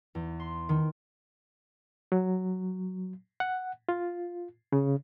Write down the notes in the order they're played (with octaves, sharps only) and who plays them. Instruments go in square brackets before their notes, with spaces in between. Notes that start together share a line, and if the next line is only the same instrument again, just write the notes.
[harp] E2
C6
D#3
[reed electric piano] F#3
F#5
F4
C#3